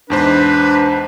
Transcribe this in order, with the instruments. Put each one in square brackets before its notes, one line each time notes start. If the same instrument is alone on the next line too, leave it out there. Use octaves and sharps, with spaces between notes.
[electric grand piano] E2 G#2 C5 [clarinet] D4 [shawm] B4